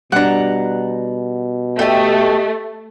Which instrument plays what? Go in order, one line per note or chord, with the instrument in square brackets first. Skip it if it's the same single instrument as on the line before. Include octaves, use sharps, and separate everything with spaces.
[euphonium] B2 [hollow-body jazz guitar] G3 D4 [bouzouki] F#5 A#5
[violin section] A3 [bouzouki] G4 D#5